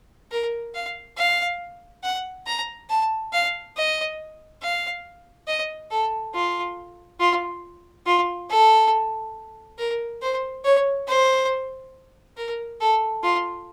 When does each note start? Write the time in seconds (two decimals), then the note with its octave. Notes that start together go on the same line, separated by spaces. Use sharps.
0.31 A#4
0.74 F5
1.17 F5
2.03 F#5
2.47 A#5
2.90 A5
3.33 F5
3.76 D#5
4.62 F5
5.47 D#5
5.91 A4
6.34 F4
7.20 F4
8.06 F4
8.50 A4
9.78 A#4
10.22 C5
10.64 C#5
11.07 C5
12.37 A#4
12.81 A4
13.23 F4